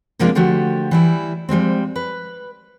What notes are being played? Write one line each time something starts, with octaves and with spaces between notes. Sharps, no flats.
C3 F3 G#3 A#3 D4 F4
D3 F3 A3 F#4 G4
E3 G3 E4
F3 G3 G#3 C4
B4